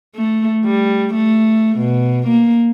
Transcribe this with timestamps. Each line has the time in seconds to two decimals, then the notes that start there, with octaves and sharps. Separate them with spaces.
0.16 A3
0.65 G3
1.14 A3
1.79 B2
2.28 A#3